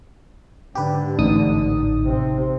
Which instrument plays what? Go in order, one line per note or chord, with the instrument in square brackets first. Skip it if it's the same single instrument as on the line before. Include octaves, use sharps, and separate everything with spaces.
[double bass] G#2 D3 [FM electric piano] G4 B4
[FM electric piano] A1 D#4 D#6
[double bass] C3 C4